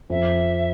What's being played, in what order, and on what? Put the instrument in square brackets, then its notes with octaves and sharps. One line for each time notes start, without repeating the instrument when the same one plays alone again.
[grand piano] F2 [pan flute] E5